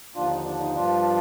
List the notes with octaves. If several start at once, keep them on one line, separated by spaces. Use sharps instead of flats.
D#2 D3 F3 D4 F4
D#4
D4
D#4
G2 F3 D4 F4